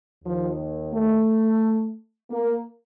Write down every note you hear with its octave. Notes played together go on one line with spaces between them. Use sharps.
D#2 D#3 F3
A3
A#3